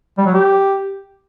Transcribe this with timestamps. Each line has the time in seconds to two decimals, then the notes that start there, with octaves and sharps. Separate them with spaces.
0.18 G3
0.26 F#3
0.34 G4